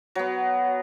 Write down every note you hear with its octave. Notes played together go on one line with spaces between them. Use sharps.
F#3 B3